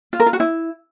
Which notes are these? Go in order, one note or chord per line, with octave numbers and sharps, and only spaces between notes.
F4
A#4
F4
F#4
E4